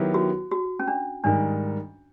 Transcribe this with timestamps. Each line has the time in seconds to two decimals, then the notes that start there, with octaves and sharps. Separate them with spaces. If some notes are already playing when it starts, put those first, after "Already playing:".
Already playing: D#3 F#3 B3 E4 G4
0.14 F#4
0.51 F#4
0.79 C#4
0.88 D4
1.24 G#2 D#3 G3 D4